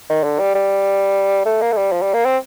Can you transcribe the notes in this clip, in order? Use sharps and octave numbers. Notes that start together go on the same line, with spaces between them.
D#3
D3
G3
G3
A3
A#3
A3
G3
F3
G3
A#3
C4